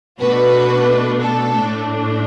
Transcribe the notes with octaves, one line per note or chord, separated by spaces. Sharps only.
B2 A3 D4 F#4 B4
A4
A2 A3 D4